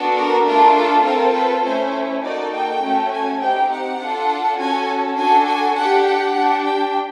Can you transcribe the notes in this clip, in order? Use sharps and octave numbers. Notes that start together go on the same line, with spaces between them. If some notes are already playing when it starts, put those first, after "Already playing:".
Already playing: B3 D4 F#4 A4
A#4
A3 D4 F4 A4 A#4
A4
C4 F4 A4 A#4
B4
A3 C#4 E4 C5
A#3 D#4 F#4 A4 D5
G5
A3 C#4 F#4 A4
G#5
C4 D#4 G4 G5
F#5
D4 F4 A4
C#4 F#4 A4 G#5
D4 F#4 A4 G#5
G#5
D4 G4 F#5
F#5
D4 G4
G5